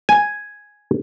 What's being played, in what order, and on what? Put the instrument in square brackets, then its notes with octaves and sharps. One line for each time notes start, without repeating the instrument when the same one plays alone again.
[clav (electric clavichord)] G#5